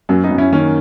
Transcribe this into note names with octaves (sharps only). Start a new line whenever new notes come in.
F#2 F#3 A#3
B3 D#4
F#2
C#4 E4
D#3 A#3 C#4